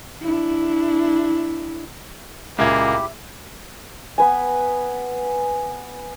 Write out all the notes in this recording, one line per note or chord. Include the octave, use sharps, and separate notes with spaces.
D4 E4
C#2 A#2 A#3 E4 G4 E5 G#6
B3 B4 G#5